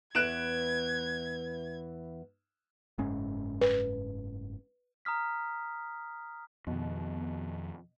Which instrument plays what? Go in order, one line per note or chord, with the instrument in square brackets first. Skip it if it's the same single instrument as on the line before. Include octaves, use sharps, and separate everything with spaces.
[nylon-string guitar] E2 E3 [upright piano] F#6 D7 E7 [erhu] G#6
[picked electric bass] F#1 G#2 C#4
[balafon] B4
[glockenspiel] A#5 D#6 F6 B6
[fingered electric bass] F2 D#3 [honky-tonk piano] B2